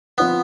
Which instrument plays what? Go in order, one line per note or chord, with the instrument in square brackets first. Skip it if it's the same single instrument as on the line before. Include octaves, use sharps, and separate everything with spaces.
[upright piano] F3 C4 F4 B4 [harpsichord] B3